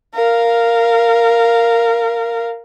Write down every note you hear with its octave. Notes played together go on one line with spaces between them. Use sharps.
A#4 F5